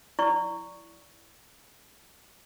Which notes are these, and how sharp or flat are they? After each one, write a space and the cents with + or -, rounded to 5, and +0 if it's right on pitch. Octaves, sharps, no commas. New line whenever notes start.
E4 +0 D5 -15 C#6 +5